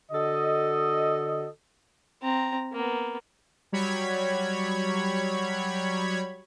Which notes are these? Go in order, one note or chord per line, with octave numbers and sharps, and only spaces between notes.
D3 F#4 A4 D#5
C4 A#5
A#3 B3
F#3 G3 C#5 B5 G#6